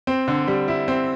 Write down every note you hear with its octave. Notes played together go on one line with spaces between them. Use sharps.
C4
D3
G3
E4
C4